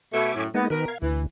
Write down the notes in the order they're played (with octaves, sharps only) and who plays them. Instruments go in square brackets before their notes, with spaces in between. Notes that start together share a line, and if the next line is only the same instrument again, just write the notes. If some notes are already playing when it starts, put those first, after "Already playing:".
[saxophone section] B2 A3 [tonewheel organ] E5 G#5 D6
[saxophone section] F#2 A2
[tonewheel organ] G#3 A#3 D#4 [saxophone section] B3
[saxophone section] B2 A#4 [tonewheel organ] D#3 B4
[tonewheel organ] F5 G#6
[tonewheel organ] D2 [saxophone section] E3